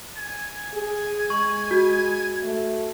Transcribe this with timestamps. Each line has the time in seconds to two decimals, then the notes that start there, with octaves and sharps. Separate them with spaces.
0.17 G#5
0.74 G#4
1.30 G#3 C#6
1.71 F#4
2.43 A3